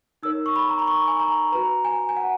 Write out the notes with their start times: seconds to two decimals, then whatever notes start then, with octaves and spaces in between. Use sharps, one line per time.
0.23 D#4 A#4 C#5 E6
0.46 C#6
0.56 B5
0.69 A#5
0.79 B5
0.87 C#6
1.08 G#5
1.20 A#5
1.52 F#4 B4 A#5
1.84 G#5
2.09 G#5
2.17 F#5